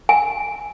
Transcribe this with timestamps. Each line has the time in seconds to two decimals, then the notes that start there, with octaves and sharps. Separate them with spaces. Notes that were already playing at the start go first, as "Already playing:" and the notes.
0.09 G#5